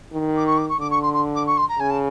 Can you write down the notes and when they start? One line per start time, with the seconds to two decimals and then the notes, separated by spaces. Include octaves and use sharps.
0.13 D#3
0.36 D6
0.46 C#6
0.57 D6
0.69 C#6
0.79 D3 D6
0.90 C#6
1.02 C6
1.13 C6
1.35 D6
1.46 C#6
1.57 C6
1.68 A#5
1.79 C#3 G#5
1.90 A5